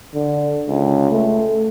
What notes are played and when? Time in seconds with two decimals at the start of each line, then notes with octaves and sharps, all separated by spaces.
0.14 D3
0.68 C#2
1.12 A3